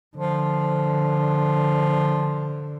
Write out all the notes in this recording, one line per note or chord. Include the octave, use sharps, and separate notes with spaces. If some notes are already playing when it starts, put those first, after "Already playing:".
D3 F3